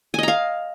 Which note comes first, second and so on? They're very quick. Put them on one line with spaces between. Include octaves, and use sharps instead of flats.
G#5 D#5 A#5 F5